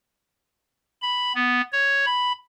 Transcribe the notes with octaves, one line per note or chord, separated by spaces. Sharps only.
B5
B3
C#5
B5